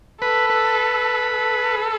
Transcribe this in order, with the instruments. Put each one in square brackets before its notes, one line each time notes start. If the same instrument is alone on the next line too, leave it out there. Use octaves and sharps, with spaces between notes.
[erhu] A4 [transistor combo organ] B4
[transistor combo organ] B4
[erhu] A4